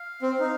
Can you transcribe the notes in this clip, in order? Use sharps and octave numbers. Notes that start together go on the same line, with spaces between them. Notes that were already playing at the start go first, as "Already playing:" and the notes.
Already playing: F5
C4
D#4